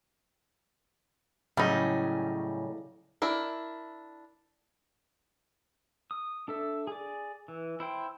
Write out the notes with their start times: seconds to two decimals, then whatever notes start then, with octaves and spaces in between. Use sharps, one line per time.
1.57 A2 C#3 F#3 G3 C#4 D#4
3.22 D4 E4 A#4
6.11 D#6
6.48 D4 A4 E5
6.87 G#4 D5
7.48 E3
7.80 E4 C5 G5